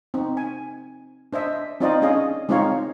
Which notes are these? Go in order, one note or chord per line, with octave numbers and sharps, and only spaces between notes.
C4 D#4
G#5
D4 C5 D#5 E5
C4 D#4 F4 C5 D5 D#5
C#4 D4 G#4 D#5 F5
G#3 C4 D#4 F4 C#5 F5